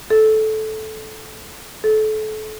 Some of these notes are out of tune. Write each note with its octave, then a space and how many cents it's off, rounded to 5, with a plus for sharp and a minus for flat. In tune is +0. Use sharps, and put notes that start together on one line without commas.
A4 -15
A4 -30